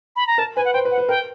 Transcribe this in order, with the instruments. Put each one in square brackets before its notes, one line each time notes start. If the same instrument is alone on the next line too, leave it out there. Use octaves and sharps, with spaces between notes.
[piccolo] B5
A#5
[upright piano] A#4 [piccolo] A5
[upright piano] B4 [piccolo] G#5
[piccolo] F#5
[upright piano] C5 [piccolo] G5
[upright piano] B4
[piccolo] F#5
[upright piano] B4
[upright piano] A#4 [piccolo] G5